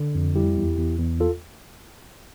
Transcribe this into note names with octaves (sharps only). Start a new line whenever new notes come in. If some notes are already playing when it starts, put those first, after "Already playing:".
Already playing: D3
F2
G3 E4 G4
E2
E2
E2
F4 A4